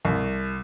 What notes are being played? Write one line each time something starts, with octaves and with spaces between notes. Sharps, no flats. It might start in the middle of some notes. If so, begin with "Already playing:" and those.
C2